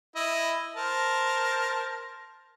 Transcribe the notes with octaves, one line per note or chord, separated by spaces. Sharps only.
E4 D#5
A#4 C5 A5